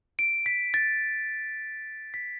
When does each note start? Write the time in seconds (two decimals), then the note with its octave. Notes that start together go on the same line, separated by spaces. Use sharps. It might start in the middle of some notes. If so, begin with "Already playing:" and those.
0.19 D7
0.46 B6
0.74 A6
2.14 B6